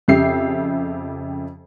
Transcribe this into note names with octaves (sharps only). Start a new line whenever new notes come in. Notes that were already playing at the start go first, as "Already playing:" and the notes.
F2 C#3 G4 E5 C7